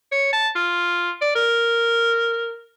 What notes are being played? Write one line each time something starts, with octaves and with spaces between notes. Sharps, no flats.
C#5
A5
F4
D5
A#4